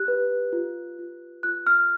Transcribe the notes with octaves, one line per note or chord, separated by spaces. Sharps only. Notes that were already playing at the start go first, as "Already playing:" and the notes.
Already playing: G4 F#6
B4
F4
F4
F4 F#6
F6